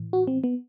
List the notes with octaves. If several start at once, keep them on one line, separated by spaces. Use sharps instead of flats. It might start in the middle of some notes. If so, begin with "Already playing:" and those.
Already playing: A2 E3
F#4
C4
B3